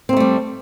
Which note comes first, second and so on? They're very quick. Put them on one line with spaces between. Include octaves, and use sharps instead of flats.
C4 A#3 A3 G3